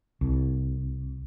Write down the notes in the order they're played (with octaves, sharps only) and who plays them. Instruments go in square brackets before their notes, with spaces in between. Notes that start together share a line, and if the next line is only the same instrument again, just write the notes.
[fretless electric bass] C2